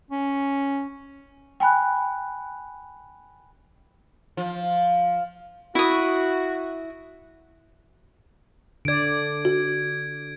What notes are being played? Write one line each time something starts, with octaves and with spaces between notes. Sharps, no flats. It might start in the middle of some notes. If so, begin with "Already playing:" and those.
C#4
G5 G#5 B5 F#6
F3
E4 F#4 D#6
D3 D5 G#6 D7
F#4